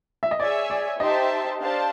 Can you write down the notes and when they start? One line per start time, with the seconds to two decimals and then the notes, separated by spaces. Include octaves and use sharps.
0.23 E5
0.31 D#5
0.39 G#4 C#5 D5 E5 G#5
0.70 D5
0.99 D#4 G4 C5 D#5 E5 A5
1.61 D4 G4 C5 F5 A5